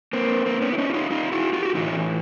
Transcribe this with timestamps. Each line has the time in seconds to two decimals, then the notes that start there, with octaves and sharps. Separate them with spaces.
0.13 A#3 C4
0.46 A#3 C4
0.62 B3 C#4
0.73 E4
0.78 C#4 D#4
0.90 E4
0.94 D#4 F4
1.11 D#4 F4
1.32 E4 F#4
1.53 F4 G4
1.65 F#4
1.75 A2 E3 D#4 F4